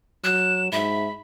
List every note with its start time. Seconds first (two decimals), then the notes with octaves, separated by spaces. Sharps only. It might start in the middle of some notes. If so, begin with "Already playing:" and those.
0.24 F#3 F#6 E7
0.72 G#2 E5 B5